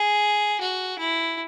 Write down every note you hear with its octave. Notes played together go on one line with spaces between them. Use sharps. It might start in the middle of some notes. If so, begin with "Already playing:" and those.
Already playing: G#4
F#4
E4